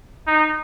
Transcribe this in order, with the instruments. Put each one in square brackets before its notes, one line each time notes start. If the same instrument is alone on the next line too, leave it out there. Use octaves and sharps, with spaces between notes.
[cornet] D#4